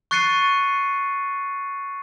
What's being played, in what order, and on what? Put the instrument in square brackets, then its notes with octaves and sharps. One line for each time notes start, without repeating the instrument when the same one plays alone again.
[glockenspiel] C#6 F#6 A6 C7 C#7 D#7